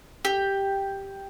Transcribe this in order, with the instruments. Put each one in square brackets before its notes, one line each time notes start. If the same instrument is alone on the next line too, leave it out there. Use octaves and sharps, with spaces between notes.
[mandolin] G4